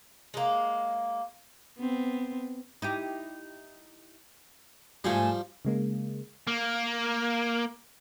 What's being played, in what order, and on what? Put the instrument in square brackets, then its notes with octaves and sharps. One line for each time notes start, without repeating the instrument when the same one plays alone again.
[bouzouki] G#3 A#3
[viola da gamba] B3 C4
[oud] D#4 E4 G4
[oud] G#2 A3 G#4 [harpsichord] F3 G3
[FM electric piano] C#3 G#3 A#3
[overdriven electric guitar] A#3